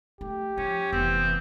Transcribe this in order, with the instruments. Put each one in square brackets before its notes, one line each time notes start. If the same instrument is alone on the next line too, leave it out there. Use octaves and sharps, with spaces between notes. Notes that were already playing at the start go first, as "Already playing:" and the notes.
[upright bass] A3 [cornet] G4
[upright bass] F3 [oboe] C#4
[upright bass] F1 [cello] E3 B3 [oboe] C4